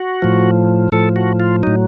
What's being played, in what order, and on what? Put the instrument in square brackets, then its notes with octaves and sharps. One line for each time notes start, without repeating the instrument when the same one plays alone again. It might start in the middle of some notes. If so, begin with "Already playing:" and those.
Already playing: [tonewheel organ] F#4
A2 F3
A2 F3 A4
F#4
F4
A2 F#3 D#4